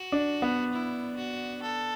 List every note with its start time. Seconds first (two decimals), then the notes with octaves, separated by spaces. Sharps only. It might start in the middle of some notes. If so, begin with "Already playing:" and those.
Already playing: F#4
0.12 D4
0.42 B3
0.73 E4
1.16 F#4
1.62 A4